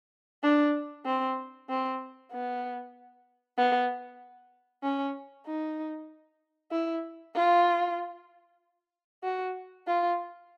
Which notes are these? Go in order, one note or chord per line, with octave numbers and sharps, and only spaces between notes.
D4
C4
C4
B3
B3
C#4
D#4
E4
F4
F#4
F4